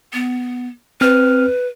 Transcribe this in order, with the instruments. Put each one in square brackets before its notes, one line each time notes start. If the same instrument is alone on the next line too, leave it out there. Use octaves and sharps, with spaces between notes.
[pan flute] B3
[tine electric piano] C4 F6 [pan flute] B4